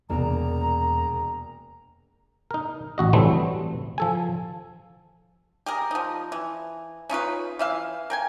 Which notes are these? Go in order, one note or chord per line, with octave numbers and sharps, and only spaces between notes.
E1 E2 C3 A#3 B3 D4 A#5
D#4 A#4
A1 F#4 D#5
E3 F#3 G3 A3 C4 E4
F3 A4 G#5
G4 G#4 A#4
F3 D#4
E3
C#4 D#4 F4 B4
E3 E5 F5
A#4 G5 G#5